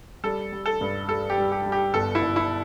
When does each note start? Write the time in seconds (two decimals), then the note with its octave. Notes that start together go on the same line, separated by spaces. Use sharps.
0.24 G3 A4
0.52 G3
0.66 A4
0.81 G2
1.08 G3 A4
1.30 G4
1.38 G3
1.52 G4
1.66 G3
1.72 G4
1.94 G1 A4
2.15 E4
2.22 G1
2.36 E4